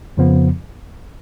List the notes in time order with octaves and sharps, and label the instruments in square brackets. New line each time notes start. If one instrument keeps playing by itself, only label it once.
[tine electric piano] F2 C#3 F3 B3